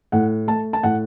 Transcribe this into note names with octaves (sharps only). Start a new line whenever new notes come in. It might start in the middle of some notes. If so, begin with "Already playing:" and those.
A2 F#5
A3 A5
A5
A2 F#5